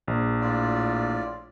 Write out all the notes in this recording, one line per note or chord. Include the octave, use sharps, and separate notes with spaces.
A#1
A2 F4 D5